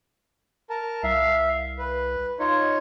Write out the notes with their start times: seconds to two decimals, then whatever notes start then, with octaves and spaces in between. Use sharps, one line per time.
0.70 A#4 A5
1.03 C2 E5 F5
1.79 B4
2.39 D#4 F4 C#5